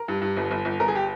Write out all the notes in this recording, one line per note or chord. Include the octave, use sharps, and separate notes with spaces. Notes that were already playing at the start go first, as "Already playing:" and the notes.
Already playing: A#4
G2
G2
G1
G1
G1
G1 A#4
G#4
G4